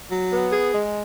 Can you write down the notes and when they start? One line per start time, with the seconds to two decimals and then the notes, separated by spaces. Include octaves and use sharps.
0.11 F#3
0.32 B3
0.53 G#4
0.72 G#3